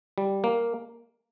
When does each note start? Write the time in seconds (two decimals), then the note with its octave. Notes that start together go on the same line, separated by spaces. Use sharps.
0.18 G3
0.44 A#3